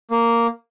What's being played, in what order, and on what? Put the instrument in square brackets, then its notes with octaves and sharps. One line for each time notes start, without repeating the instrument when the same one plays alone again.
[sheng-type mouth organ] A#3